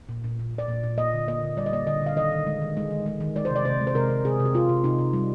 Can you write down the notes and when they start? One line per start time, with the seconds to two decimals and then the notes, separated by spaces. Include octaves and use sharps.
0.09 A#2
0.24 A#2
0.39 A#2
0.54 A#2 D5
0.69 A#2
0.83 A#2
0.98 A#3 D#5
1.13 D3
1.28 A#3 D#5
1.43 D3
1.57 G3 D5
1.66 D#5
1.72 A#3 D5
1.87 D3 D#5
2.02 D3 F5
2.16 D#3 D#5
2.32 D#3
2.47 G#3
2.61 D#3
2.77 G#3
2.91 D#3
3.06 G#3
3.20 D#3
3.36 G#3 D5
3.45 C5
3.50 C3
3.56 D5
3.65 C3 C5
3.81 G#3
3.87 C5
3.95 C3 A#4
4.09 C3
4.25 C3 G#4
4.40 C3
4.45 G4
4.54 C3 F4
4.69 C3
4.84 C3 D#4
4.98 C3
5.13 G3